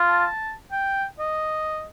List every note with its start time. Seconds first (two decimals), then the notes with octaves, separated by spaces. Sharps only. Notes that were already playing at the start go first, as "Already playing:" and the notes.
Already playing: F4
0.08 A5
0.72 G5
1.19 D#5